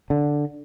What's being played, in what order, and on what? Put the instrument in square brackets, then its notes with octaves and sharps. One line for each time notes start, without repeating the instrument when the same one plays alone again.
[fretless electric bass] D3